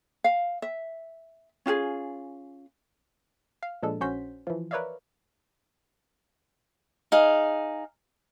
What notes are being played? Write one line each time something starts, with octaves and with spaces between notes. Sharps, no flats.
F5
E5
C#4 F4 G4 G#4
F5
A#2 F3 G#3 D4 A4
A#1 C#4 F#4 C5 G6 B6
E3 F3
A#4 B4 C#5 D5 E5 F5
D#4 G#4 F5